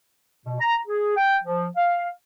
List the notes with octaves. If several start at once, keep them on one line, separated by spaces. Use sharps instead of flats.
B2
A#5
G#4
G5
F3
F5